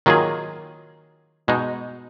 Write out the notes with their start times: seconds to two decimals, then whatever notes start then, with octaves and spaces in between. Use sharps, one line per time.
0.06 D#3 F#3 A#3 F4 G#4
1.48 B2 G#3 D#4